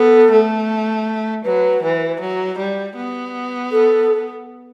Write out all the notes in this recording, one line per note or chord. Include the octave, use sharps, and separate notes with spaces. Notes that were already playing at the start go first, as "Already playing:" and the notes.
Already playing: B3 A4
A3
F#3 B4
E3
F#3
G3
B3
A4